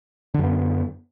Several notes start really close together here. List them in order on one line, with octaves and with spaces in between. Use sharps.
D3 F#2 B3